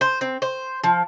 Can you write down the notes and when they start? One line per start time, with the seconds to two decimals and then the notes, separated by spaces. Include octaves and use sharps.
0.01 C5
0.21 C4
0.42 C5
0.83 F3